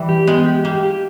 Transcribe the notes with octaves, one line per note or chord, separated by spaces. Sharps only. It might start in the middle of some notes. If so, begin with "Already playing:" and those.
Already playing: E3 G3
G4
G#3 B3
G4
A#3 G4
G4